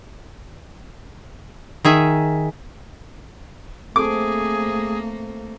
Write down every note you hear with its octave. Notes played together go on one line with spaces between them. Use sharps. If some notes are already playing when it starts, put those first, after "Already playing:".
D#3 G#4 E5
A3 A#3 C4 G#4 A4 D6